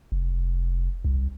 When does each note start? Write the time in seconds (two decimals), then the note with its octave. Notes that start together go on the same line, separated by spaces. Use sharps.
0.12 F1
1.05 C2